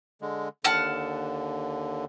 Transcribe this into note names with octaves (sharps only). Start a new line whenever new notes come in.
D3 G#3
D#2 D3 F#5 A5 F6